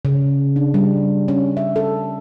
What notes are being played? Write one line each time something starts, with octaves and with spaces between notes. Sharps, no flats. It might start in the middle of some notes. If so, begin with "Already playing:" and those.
C#3
D4
G3
C#4
E5
A4